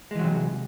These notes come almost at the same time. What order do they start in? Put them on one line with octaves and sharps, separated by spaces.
G#3 E3 F#3 C3